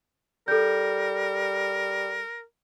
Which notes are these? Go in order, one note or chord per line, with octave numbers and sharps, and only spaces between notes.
G3 A4 A#4 G6